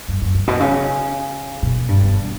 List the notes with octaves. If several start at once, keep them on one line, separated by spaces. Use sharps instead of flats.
G2
F#2
G2
B2
C#3
B2
G2
E2